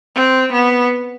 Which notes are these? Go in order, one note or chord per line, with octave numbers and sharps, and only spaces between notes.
C4
B3